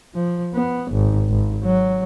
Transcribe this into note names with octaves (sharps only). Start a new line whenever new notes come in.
F3
B3
G#1
G#1
F#3